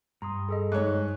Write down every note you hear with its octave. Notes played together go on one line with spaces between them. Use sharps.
G2 A#5 C6 D#6
G#4 A4 D#5
G#2 C#5 F#6